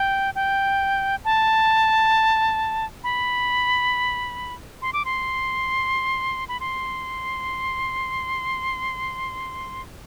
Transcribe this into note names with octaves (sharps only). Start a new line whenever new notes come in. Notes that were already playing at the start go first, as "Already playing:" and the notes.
Already playing: G5
G5
A5
B5
C6
D6
C6
B5
C6